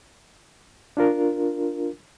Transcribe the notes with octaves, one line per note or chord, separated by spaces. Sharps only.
D4 F4 A#4